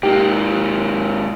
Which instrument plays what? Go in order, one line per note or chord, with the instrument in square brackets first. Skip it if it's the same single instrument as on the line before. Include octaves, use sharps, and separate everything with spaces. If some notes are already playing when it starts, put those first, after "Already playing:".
[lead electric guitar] G#2 A#3 [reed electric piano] D#4 G4